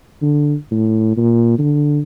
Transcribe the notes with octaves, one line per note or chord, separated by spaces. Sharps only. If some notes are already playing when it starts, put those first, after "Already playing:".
D3
A2
A#2
D3